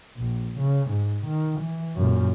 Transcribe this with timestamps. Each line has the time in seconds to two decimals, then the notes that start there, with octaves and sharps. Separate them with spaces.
0.17 A#1
0.58 C#3
0.89 G#2
1.27 D#3
1.60 E3
1.96 F#2 A#2